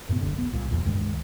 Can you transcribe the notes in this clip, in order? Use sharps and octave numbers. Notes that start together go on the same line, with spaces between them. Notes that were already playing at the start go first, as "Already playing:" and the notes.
F#2 A2 C3 B3
F#1 C2 D3
B3
C2 A#2
E1 B1 E2 A#2
C#2 G2 D#3 G#3